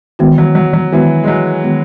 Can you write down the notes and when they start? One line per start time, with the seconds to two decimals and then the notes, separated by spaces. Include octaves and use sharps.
0.19 D#3 E3 G#3 B3 F#4
0.38 F#3
0.55 F#3
0.73 F#3
0.92 D#3 E3 G#3 B3 F#4
1.24 G#3
1.27 F#3
1.64 D#3 G#3 B3 F#4